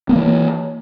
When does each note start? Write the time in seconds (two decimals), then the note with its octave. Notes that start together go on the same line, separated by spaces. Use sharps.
0.09 B3
0.12 A#3
0.15 E3